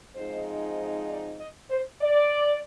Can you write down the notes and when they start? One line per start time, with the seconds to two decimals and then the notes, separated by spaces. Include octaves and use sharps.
0.16 G#2 F3 G#3 C4 D#4 C5
1.09 D5
1.40 D#5
1.71 C5
2.02 D5